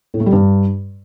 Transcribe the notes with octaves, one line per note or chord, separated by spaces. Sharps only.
A2
A3
G3
G2